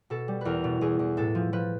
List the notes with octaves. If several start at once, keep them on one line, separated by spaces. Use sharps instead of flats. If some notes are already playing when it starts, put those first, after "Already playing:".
B2 A4
G3
E2 A#4 B4
B2
E2 G#4
E2
A2 A4
F3
F3 B4